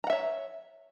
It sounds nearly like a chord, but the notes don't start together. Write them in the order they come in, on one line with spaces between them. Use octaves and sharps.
A#5 F#5 E5 C#5